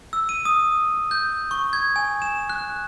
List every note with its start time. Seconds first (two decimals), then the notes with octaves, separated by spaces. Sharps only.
0.13 E6
0.29 D#7
0.45 D#6
1.11 G6
1.51 C#6
1.73 G#6
1.96 G#5
2.22 E7
2.50 F#6